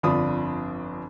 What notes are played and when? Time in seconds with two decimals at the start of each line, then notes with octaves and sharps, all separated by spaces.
0.03 G1 F2 D4 F4 B5 D#6